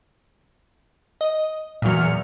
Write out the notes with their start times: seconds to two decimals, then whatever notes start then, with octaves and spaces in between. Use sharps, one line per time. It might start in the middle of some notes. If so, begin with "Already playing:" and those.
1.21 D#5
1.82 E2 A#2 F#3 F6 C#7